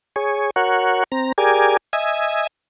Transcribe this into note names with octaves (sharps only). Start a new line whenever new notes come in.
G#4 C#5
F#4 A#4 C#5 F#5
C4 A#5
G4 G#4 A#4 D5 G#5
D#5 E5 G#5